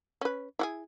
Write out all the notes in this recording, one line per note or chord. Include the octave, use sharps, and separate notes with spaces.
C#4 B4
E4 F#4 G#4